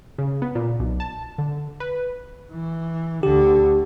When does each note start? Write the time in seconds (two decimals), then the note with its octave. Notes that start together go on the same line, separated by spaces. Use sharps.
0.18 C#3
0.42 B3
0.55 A#2
0.80 B1
1.00 A5
1.38 D3
1.80 B4
2.52 E3
3.23 D2 D3 G4